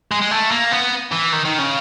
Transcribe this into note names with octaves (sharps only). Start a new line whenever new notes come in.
G#3
G#3
A3
A#3
B3
E3
D#3
D#3
C#3